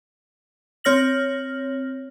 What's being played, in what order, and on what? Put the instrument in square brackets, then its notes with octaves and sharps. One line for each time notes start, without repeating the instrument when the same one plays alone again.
[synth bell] C4 C#5 F6 A#6 F#7